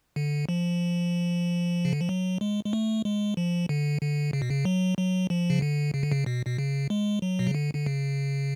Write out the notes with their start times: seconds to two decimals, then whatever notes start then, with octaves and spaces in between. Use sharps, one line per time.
0.16 D3
0.49 F3
1.85 C#3
1.93 D3
2.01 F3
2.09 F#3
2.41 G#3
2.65 G#3
2.73 A3
3.05 G#3
3.37 F3
3.69 D3
4.02 D3
4.33 C#3
4.42 B2
4.50 C#3
4.65 F#3
4.98 F#3
5.30 F3
5.50 C#3
5.62 D3
5.94 C#3
6.03 D3
6.12 C#3
6.26 B2
6.46 B2
6.58 C#3
6.90 G#3
7.22 F#3
7.39 B2
7.47 C#3
7.55 D3
7.75 D3
7.86 C#3